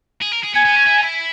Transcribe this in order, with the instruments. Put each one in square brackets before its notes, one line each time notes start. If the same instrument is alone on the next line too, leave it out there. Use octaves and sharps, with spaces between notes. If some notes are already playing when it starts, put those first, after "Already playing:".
[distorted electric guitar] G#4
A#4
G#4
[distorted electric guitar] B3 [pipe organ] G#5
[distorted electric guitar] B3
C#4
E4
D#4
E4